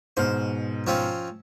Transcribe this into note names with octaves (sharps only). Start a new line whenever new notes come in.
G#2 B2 C5 F6
F3 C4 C#4